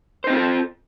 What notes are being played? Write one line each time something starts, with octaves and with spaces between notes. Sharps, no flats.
C4 D#4 F4 A4 C5